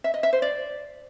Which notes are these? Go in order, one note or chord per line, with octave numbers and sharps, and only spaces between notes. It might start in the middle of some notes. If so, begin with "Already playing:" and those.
E5
D#5
E5
C5
D5